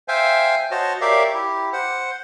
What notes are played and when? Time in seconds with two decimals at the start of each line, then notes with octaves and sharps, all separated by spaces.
0.08 C5 E5 F5 G5 G#5
0.71 F#4 C5 C#5 D#5 A5
1.01 G4 A#4 C#5 D5 E5 F5
1.34 E4 G4
1.73 C5 F#5